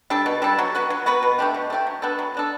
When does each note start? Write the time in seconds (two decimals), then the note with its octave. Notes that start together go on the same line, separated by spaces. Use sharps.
0.10 G3 D4 A4
0.26 B2
0.42 G3 D4 A4
0.58 F#3
0.75 B3 F#4 B4
0.90 F#3
1.06 B3 F#4 B4
1.23 B2
1.39 A3 D4 G4
1.54 B2
1.70 A3 D4 G4
1.87 F#3
2.02 B3 D4 A4
2.19 F#3
2.34 B3 D4 A4